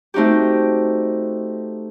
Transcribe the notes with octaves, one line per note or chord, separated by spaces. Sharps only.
A3 C4 D#4 F#4 G4